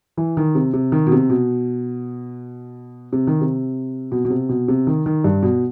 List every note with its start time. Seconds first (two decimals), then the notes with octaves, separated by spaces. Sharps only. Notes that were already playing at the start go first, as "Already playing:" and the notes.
0.17 E3
0.37 D#3
0.55 C3
0.73 C3
0.92 D#3
1.07 B2
1.12 C3
1.30 B2
3.13 C3
3.27 D#3
3.41 C3
4.12 B2
4.25 B2
4.30 C3
4.49 B2
4.68 C3
4.87 D#3
5.06 D#3
5.24 G2
5.43 B2